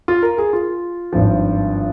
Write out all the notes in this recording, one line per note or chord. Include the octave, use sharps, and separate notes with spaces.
F4
A#4
G#4
F4
G#1 G2 F3